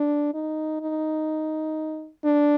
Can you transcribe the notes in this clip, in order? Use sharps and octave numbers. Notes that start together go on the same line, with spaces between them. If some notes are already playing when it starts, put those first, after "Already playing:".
Already playing: D4
D#4
D#4
D4